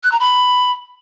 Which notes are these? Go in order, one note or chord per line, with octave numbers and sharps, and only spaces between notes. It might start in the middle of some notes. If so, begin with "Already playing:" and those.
F#6
A#5
B5